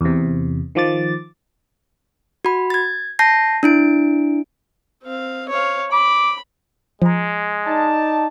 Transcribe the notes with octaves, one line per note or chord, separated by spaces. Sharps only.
E2 C3
D#3 F3 D6 A6
F#4 B5
G#6 A6
A5 G6 A#6 C7
D4 E4 D7
C4 F5
C#5 F5
B5 D6
F3 G#3 A#5
D#4 D5 A5